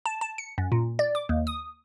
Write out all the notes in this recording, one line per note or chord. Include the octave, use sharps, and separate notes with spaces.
A5
A5
C#7
F#2
A#2
D5
D6
D#2
D#6